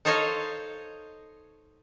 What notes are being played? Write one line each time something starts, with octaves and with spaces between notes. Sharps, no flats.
D#4 A4 C5 C#5 D#5 F5